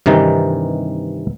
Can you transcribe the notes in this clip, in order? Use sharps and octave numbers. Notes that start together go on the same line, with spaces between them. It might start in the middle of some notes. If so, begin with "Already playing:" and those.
G2 C3 D#3 E3 D#4